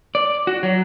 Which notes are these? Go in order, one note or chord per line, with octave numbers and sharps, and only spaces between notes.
D5
F#4
F#3